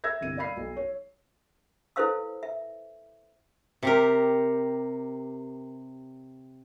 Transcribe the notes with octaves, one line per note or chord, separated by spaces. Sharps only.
E5 E6 G#6 A#6
G1 C2 D#7
D5 F5 B5 C7
B1
C#5
E4 A4 B4 C5 F5 E6
E5
C3 G4 A#4